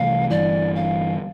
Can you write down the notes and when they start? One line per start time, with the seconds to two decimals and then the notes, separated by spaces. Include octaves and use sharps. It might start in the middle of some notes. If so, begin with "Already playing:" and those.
Already playing: C2 C3 E3 A3 F5
0.30 G1 G2 E3 D5
0.75 F5